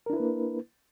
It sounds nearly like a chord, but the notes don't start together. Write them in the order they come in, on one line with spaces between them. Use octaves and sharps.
A#4 D4 E4 B4 A#3